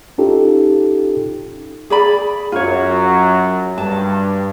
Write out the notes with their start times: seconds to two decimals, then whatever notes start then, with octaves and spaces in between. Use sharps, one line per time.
0.18 C#4 D#4 F4 G4 A4
1.90 G#4 D5 B5
2.52 F#2 F#3 F4 C#5
3.78 G2 A5